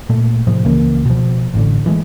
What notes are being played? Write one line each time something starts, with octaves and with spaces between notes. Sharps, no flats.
A#2 A3
A2 C3 F3
C#2 C#3 E3 A#3
B2 F3
A1 A2 D3
E3 F3 G#3 A3